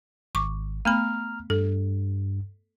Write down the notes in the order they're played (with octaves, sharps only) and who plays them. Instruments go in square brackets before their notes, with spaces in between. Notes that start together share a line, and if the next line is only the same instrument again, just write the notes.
[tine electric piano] G#1 [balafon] C#6 D6
[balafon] A3 B3 B5 [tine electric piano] A#5 F6
[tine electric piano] G2 [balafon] A4